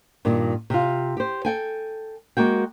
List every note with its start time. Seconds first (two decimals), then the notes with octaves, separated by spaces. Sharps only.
0.25 G2 A#2 D#3
0.70 C3 F4
1.17 G4 C5
1.45 A4 G5 G#5
2.37 G#3 A#3 F#4 G5